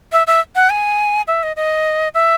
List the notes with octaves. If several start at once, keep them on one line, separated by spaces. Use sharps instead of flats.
E5
E5
F#5
G#5
E5
D#5
D#5
E5